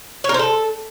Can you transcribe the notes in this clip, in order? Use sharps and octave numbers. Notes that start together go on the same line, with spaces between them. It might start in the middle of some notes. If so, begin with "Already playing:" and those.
C#5
A#4
C5
A4